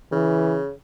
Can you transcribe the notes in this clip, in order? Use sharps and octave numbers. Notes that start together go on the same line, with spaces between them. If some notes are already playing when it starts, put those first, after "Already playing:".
C#3 E3